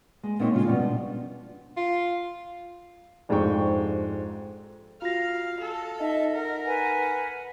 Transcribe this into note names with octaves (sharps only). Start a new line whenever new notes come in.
G#3
A#2 C4 D#4 C#5
C#3 G#3 F4
G2 B2 F3 G3
D4
F4
F2 G#2 D4 G4 G5 C#6
F4 F#4 F5 A#6
A4
D#4 D#5 E5
A#4 F#5
B4 F#5 G#5